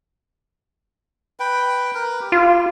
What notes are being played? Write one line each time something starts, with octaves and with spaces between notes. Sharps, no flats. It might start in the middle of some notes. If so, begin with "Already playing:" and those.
B4 G5
A#4 B4
G4
F4